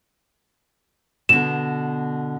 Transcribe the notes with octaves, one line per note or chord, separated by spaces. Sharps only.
B2 D3 E7